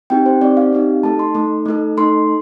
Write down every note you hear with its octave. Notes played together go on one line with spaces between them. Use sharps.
C4 D#4 G4 G5
C5
C4 D#4 G4 D5
F5
C4 D#4 G4
A3 D#4 A4 A5
C6
A3 D#4 A4
A3 D#4 A4
A3 D#4 A4 C6